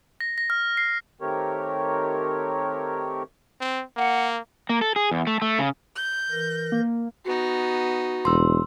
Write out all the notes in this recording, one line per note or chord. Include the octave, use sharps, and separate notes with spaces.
A#6
A#6
F6
C7
D#3 A3 C4 G4 A#4 C#5
C4
A#3 F#5
A#3
A4
G#4
E2
A3
A3
C#3
G6
E3 A#4 A#6
A#3
B3 D#4 F#4
E1 C6 E6